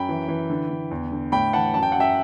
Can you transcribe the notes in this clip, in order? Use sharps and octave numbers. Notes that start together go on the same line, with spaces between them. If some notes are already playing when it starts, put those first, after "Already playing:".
Already playing: F#2 G5 B5
E3
E3
D3
D3
E2
D3
A2 G5 B5
E3 F#5 A5
F#2 A5
G5
F#2 F#5
E5 G5